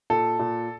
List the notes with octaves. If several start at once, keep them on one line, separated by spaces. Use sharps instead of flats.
A#2 A4
A#2